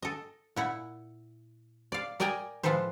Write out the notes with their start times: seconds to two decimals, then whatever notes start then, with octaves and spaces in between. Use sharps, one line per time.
0.02 A4 D#5
0.56 A#2 E4 F#5
1.92 D5 F5
2.20 A#4 D5 D#5 G5 G#5 A#5
2.63 A2 F3 G#3 A4 B4 C5